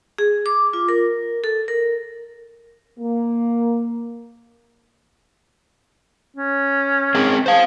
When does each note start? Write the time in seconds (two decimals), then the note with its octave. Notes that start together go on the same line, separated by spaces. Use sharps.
0.18 G#4
0.46 D6
0.73 F4
0.89 A#4
1.44 A4
1.68 A#4
2.99 A#3
6.36 C#4
7.15 C4 G#4 A#4
7.46 G#4 C5 F5